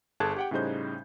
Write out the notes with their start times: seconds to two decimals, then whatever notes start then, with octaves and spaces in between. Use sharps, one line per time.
0.20 G1 G#4 A4 A5 F#6 G#6
0.36 G4 F#5 G5
0.51 A2 C#3 G3 D#4 C5 G6